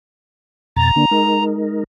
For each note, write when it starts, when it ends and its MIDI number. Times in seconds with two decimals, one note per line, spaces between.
0.76 0.91 41
0.76 0.91 47
0.76 1.44 82
0.76 0.91 93
0.96 1.05 50
0.96 1.05 58
0.96 1.05 62
1.11 1.84 56
1.11 1.84 63
1.11 1.84 70